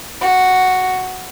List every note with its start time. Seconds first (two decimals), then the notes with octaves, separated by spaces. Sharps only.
0.22 F#4